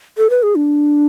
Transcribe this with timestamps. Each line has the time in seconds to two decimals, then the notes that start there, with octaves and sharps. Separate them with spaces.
0.18 A4
0.30 B4
0.43 G#4
0.56 D4